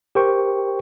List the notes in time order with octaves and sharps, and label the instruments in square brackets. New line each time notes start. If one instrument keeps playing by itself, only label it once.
[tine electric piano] G4 A#4 C5 G5 C#6